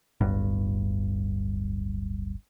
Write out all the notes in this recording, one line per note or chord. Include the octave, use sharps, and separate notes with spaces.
D1 G1 G2